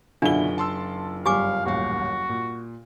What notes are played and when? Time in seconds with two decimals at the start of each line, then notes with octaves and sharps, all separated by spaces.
0.22 F#1 B2 D3 D4 E4 F4 G7
0.58 A5 C6 E6
1.26 G1 G3 G4 F5 G#5 D6
1.65 D#1 A1 F#4 F5
2.29 A#2